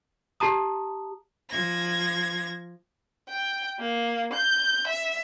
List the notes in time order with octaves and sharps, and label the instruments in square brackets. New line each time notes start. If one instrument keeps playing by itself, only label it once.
[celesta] G4 A5 A#5 D#6
[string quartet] F3 G#6 A#6
[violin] G5
A#3
G6
E5